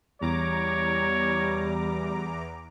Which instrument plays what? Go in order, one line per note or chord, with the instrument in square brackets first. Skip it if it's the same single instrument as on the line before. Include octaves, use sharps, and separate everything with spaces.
[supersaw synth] E2 A#5 D6 [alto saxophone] G3 [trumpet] C#5